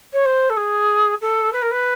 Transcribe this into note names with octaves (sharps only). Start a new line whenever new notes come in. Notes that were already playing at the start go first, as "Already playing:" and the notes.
C#5
C5
A4
G#4
A4
B4
A#4
B4